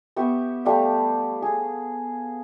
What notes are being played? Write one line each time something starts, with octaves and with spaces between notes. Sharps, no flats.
B3 G4 E5 C#6
G3 A3 F5
G#4